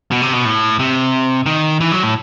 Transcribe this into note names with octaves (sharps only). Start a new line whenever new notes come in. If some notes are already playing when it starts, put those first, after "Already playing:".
B2
C3
B2
A2
C3
D#3
E3
F#3
A2